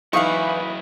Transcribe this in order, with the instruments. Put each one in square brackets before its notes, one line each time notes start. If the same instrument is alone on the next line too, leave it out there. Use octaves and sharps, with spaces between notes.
[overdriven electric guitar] F#2 E4 [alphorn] E3 [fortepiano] D#4 F5 [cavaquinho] B4 C#6